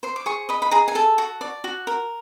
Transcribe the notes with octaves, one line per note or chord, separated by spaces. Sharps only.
C5 C6
D6
G#4 C#6
D#5 B5
B5
G#4 A#5
G#5
A4 A5
F#4
D5
F#4
A#4